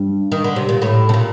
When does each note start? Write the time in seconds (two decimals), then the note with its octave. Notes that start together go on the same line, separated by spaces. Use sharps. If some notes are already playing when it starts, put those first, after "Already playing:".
Already playing: G2
0.32 D#3
0.44 D3
0.56 C3
0.69 A#2
0.82 A2
1.09 C3
1.14 A#2